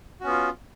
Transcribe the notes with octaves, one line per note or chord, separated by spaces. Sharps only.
B3 C#4 F4 F#4